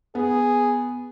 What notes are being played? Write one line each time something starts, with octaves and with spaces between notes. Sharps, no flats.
B3 G#4